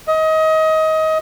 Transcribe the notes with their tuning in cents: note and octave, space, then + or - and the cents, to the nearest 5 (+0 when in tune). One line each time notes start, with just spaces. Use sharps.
D#5 +25